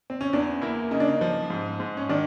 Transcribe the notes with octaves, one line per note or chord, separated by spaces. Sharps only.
C4
C#4
E2 D4
A#3 E4
C#3 D#4
D4
D#4
F3
G#2
G#2
C#4
D#3 D4